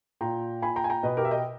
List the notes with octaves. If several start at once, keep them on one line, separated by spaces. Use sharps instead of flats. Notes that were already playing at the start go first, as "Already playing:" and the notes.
A#2 G5 A#5
A#2 G#5 B5
G5 A#5
G#5
G5 A#5
B2 B4 D#5
G4 A#4
E5
D#5 G5